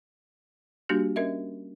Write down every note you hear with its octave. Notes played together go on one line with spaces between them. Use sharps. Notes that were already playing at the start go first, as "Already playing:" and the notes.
G3 A#3 D4 F#4 G4
C#4 A#4 D#5 E5